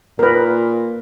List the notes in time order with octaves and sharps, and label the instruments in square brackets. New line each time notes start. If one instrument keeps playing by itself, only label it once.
[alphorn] A#2 [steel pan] A#4 B4